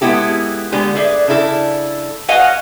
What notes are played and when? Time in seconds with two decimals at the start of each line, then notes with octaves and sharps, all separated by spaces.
0.01 G#3 B3 E4 G4 A4
0.72 D3 G#3 B3 G4
0.96 G#4 A4 B4 D5 E5
1.27 C#3 D4 E4 A4
2.28 F#4 B4 D#5 F5 F#5 G#5